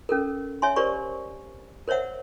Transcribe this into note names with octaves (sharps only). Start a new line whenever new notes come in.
C#4 A4 A#4
C#5 E5 G#5 C6
G4 A#4 C5 D5 C#6
A#4 C5 C#5 E5 F#5